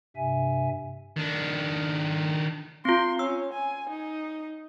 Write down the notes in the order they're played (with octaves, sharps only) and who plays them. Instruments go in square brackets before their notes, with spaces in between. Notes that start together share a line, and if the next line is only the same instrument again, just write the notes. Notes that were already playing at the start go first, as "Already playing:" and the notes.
[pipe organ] G2 C3 E5 G#5
[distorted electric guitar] D#3 D4
[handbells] C4 F4 [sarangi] C6
[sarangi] C#4 [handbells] E6
[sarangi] G#5
D#4